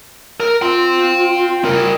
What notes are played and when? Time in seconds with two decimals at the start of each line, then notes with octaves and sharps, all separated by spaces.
0.40 A#4
0.62 F4 G5 C6
1.64 E4 A#4